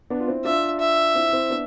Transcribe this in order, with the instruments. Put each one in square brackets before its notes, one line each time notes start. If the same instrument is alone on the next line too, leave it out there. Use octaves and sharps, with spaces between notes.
[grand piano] B3 D4
F4
C4 E4
[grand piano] D4 F4 [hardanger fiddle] E5
[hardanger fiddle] E5
[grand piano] C4 E4
C4 E4
B3 D4